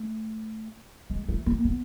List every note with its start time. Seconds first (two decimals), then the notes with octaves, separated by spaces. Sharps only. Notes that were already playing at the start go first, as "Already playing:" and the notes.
Already playing: A3
1.10 G#3
1.29 A3
1.46 A#3
1.65 B3